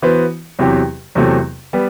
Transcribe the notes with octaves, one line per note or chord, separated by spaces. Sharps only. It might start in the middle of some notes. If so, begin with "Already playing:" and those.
E3 B3 F#4 C5
E2 C3 F#3 C4 G4
E2 C3 F#3 A3 C4
G3 B3